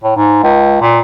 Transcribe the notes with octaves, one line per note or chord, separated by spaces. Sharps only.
A2
G#2
C#2
A#2